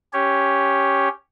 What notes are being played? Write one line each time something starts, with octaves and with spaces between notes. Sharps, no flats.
C#4 G4 C#5